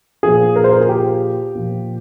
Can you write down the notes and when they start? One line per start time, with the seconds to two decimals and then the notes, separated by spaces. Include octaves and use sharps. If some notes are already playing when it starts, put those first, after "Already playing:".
0.23 A#2 F3 G#4
0.56 A#4
0.64 C5
0.73 A#4
0.81 G#4
0.89 G4
1.55 A#2 F3